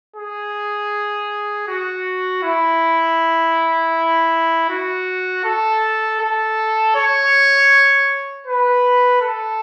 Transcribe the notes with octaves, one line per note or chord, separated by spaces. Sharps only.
G#4
F#4
E4
F#4
A4
A4
C#5
B4
A4